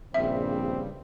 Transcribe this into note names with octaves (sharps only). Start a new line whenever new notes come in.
A#1 G2 C#3 G3 C4 E5